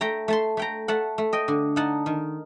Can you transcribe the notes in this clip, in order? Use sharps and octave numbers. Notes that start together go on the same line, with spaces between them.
A3 G5 A#5
A3 A5 C6
A3 G5 A#5
A3 F#5 A5
A3
D#5 G5
D3
D#4 F#5 A5
D#3